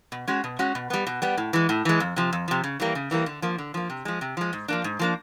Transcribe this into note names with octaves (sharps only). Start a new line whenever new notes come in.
B2
G#3 C#4 F#4
B2
G#3 C#4 F#4
B2
G3 B3
B2
G3 B3
A2
E3 G#3
A2
E3 G#3
F2
C3 F3
F2
C3 F3
C#3
E3 G3 A#3
C#3
E3 G3 A#3
D3
F3 A#3
D3
F3 A#3
C3
F3 G#3
C3
F3 G#3
G#2
F3 A#3 D4
G#2
F3 A#3 D4